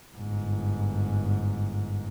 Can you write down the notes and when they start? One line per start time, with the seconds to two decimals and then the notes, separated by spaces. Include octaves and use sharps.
0.16 G1 G#2